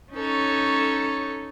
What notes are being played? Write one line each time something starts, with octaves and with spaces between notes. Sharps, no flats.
C#4 D#4 A4 C#5